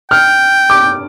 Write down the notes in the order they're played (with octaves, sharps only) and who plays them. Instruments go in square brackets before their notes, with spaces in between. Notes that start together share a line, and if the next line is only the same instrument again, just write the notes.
[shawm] G5 [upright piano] F6
[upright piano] D6